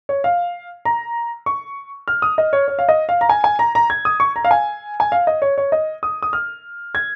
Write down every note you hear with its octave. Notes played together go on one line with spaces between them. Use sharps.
C#5
F5
A#5
C#6
F6
D#6
D#5
C#5
C#5
F5
D#5
F5
A#5
G#5
G#5
A#5
A#5
G#6
D#6
C#6
A#5
F5
G#5
G#5
F5
D#5
C#5
C#5
D#5
D#6
D#6
F6
G#6